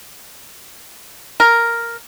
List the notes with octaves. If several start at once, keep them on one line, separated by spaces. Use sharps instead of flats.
A#4